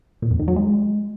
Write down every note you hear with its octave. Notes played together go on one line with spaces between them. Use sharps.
A#2
F2
D#3
F#3
G#3